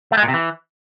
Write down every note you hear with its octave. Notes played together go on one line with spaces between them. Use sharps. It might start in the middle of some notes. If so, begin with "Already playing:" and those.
A3
G#3
A#2
C3
E3